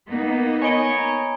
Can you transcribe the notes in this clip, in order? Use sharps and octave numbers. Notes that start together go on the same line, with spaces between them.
A#3 B3 D#4
C#5 D#5 G#5 B5 D7
A#5